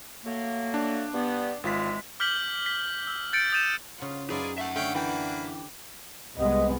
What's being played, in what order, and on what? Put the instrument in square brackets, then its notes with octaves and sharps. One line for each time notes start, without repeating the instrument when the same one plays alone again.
[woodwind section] F#3 A3 A#3
[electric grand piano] D4
[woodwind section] G2 B3
[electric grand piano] G#1 F4 B6 [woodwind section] E3 G#3
[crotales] D6 F6 G6 B6 F#7 G7
B6
E6
G6 A6 C#7 D7
D#6 G6 A6 D#7 E7
[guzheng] C#3 F#5 [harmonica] F4
[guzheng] F#2 D#4 C6 [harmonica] F4 B4 D5 [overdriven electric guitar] G#4
[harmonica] A3 [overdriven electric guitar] E5 F#5
[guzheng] D3 [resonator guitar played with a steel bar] A3 [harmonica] C#5 F5 G5
[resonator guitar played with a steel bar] E3 G5 [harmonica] A#3 D4 B4 [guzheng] F#4
[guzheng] G4
[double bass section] C2 G#3 B3 [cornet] D#5